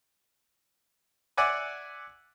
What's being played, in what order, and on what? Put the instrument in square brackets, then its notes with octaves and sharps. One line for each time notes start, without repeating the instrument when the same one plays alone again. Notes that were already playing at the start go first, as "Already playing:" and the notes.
[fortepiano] D5 E5 F#5 G#5 D6